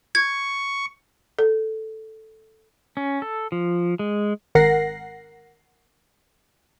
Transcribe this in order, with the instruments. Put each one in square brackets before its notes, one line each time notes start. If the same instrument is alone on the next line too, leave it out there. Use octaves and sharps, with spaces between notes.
[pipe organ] C#6 [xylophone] G#6
[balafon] A4
[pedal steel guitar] C#4
A4
F3
G#3
[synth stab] G#1 A#4 F#5 A#6 C7